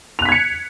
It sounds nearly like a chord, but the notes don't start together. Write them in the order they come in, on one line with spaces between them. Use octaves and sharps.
F7 F#6 B6 G#6 C#7